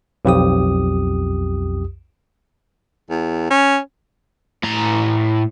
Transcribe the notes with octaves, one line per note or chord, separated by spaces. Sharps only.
B1 F2 G4 D#6
E2
C#4
A2 A#5